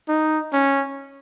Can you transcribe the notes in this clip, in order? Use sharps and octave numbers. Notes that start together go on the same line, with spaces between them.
D#4
C#4